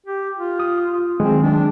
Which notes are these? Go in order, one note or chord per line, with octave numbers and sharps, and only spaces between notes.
G4
F4
D#6
D#3 F#3 G#3 C4
D4